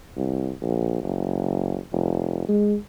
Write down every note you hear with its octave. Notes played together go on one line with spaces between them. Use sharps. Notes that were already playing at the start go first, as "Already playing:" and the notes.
C2
A#1
F#1
F1
G#3